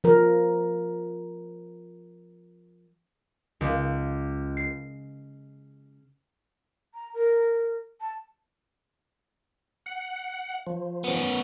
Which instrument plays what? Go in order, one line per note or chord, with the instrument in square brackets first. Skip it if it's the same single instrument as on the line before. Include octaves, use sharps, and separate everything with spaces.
[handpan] F3 A#4
[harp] C#2
C7
[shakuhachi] A#5
A#4
A5
[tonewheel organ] F#5
F3
[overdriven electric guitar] B3 C#4